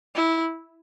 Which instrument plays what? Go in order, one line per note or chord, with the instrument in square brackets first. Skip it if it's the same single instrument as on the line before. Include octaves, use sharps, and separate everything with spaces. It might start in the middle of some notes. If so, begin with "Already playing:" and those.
[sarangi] E4